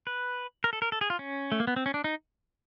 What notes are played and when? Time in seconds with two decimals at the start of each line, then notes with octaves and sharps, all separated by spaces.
0.07 B4
0.64 A#4
0.73 A4
0.82 A#4
0.92 A4
1.01 G#4
1.10 F4
1.19 C#4
1.52 A3
1.60 A#3
1.67 B3
1.76 C4
1.86 C#4
1.94 D4
2.04 D#4